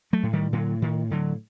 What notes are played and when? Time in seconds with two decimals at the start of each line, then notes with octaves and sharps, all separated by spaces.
0.13 F#3 A3
0.23 A2
0.33 D#3 G3
0.53 A2 D3 F#3
0.82 A2 D#3
1.11 A2 D3 F#3